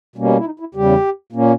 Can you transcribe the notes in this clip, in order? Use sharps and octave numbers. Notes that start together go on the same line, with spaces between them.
B2 G3 A#3 C#4
E4
D#4
E4
E2 C#3 G3 G4
A#2 A#3 C#4